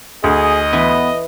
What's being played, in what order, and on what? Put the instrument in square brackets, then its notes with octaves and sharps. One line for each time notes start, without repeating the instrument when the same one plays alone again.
[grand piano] D2 [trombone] G#4 [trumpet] D#5
[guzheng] E3 B4 [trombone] B3